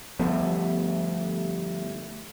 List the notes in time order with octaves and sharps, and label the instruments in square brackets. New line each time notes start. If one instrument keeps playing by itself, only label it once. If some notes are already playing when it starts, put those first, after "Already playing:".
[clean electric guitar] D2 G2 A3 [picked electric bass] F3 B3